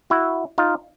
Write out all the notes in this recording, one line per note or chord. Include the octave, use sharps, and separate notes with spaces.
E4 F#4
D#4 F4